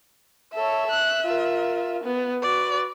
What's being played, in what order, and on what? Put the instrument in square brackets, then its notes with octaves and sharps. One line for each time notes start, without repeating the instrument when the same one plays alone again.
[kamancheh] A4 C#5 [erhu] E5
[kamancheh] F#6
F4 A#4
B3
[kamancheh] F#4 B4 [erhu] D5